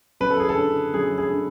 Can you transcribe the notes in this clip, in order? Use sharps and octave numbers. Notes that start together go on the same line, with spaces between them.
F#2 B4
A4
G#4
A4
D3
F#2 G#4
G#4
D3